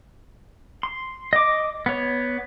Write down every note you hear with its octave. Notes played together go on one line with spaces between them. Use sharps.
C6
D#5 D6
B3 C#5